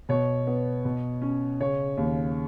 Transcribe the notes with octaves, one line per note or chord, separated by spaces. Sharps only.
B2 C#5
B3
B2
C#4
C#3 C#5
D#2